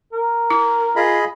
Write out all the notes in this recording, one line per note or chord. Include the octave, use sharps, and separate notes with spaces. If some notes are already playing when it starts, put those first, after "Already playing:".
A#4
E4
F4 G#4 D#5 B5